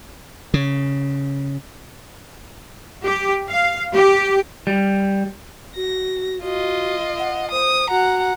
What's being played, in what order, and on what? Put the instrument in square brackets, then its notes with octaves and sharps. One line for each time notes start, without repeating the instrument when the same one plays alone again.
[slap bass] C#3
[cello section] G4
F5
G4
[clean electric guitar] G3
[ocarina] F#4 [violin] A#6
[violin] F4 D#5 [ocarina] F#4
[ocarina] F#5
[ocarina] C5 [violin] D#6
[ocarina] F#4 [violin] F#5 A#5